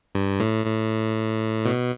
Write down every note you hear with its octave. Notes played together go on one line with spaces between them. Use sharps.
G2
A2
A2
B2